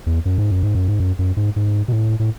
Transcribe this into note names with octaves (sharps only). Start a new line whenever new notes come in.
E2
F#2
G#2
F#2
G#2
F#2
G#2
F#2
F#2
G#2
G#2
B2
A2
A2